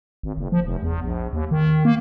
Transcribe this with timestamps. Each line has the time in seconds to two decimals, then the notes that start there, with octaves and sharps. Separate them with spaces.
0.23 G#1
0.37 F#1
0.52 F3
0.65 F1
0.83 E2
1.04 A#1
1.33 D#2
1.51 D#3
1.85 A#3